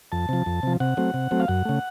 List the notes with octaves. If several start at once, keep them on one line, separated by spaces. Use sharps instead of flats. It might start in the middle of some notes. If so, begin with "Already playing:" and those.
F2 A5
C3 F3
F2
C3 F3
C3 F#5
F#3 A3 C4
C3
F#3 A3 C4
F5
F#2 F#5
C#3 A3